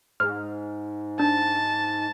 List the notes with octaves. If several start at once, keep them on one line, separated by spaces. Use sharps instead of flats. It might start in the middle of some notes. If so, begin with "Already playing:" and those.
G#2 F6
D4 A5